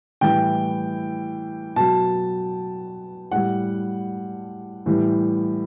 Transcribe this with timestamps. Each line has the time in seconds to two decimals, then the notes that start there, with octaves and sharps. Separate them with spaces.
0.21 A2 E3 G3 G5
1.76 B2 F#3 A5
3.31 A2 G3 F#5
4.86 A2 E3 G3